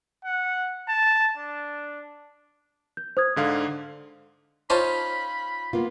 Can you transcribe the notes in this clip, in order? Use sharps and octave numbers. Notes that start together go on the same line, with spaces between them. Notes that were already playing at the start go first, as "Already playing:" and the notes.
F#5
A5
D4
G6
C5 D#6 G#6
G#2 D3 F5
C#4 D#4 F4 C5 C#5 A5 B5
A#3 B3 F4